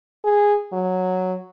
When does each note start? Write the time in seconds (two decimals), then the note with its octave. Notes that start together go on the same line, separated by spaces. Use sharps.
0.24 G#4
0.73 F#3